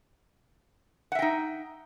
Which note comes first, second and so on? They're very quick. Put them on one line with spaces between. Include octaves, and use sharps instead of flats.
F#5 E5 G5 D#4